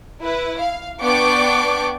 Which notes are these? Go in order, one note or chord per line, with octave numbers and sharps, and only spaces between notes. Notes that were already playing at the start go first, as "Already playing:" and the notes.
E4 B4
F5
B3 D4 D5 G5 C#6 D6